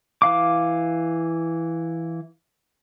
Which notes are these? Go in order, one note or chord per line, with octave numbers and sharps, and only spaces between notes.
E3 F5 D6